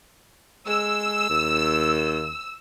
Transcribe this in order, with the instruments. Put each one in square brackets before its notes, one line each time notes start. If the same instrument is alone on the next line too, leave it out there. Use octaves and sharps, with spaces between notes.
[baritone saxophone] G#3 [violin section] E6
[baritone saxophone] D#2